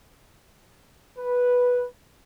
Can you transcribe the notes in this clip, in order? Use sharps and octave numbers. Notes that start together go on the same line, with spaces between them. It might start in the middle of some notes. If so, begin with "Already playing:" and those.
B4